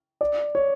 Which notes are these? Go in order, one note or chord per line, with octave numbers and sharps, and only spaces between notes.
D5
C#5